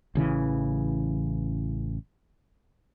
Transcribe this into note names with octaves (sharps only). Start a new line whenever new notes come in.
A1 C#3 E3